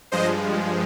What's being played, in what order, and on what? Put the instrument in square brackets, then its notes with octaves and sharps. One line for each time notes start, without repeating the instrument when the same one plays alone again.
[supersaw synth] G2 F3 G#3 C5 D#5